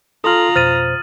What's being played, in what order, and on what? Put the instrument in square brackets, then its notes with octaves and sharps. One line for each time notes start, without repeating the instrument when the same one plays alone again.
[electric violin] F4 A#5 [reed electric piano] A4 C6 F6 [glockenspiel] D#6 F#7
[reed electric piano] F2 B2 C5 [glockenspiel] F6 A6 D#7